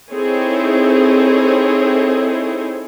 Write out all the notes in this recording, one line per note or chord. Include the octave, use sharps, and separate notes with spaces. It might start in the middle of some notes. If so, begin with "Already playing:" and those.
C4 D#4 E4 G#4 A4 C#5